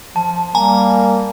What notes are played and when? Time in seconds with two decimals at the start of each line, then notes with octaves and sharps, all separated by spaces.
0.16 F3 A5
0.55 G3 A#3 G#5 A#5